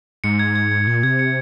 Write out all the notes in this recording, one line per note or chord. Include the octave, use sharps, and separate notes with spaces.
G#2 C#7
G#6
G#6
G#6
A#2 G#6
C3 G#6
C#7